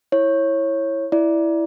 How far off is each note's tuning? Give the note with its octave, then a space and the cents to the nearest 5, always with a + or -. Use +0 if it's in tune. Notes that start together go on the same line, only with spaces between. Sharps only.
E4 +0 C#5 -15
E4 +0 D5 +0